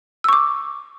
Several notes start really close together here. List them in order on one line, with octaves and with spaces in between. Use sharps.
E6 C#6 D6